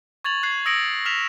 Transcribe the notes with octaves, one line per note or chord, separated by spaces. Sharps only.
C#6 G#6 A6 F7 F#7
F#6 G#6 C7
D#6 E6 A#6 C#7 D7 F#7
F6 B6 E7 F7